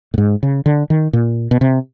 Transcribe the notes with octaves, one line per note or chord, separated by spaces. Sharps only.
A2
G#2
C#3
D3
D#3
A#2
B2
C3